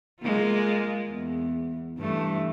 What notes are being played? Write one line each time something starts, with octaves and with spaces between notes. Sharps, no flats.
G#3 A#3 F4
E2
G2 E3 A3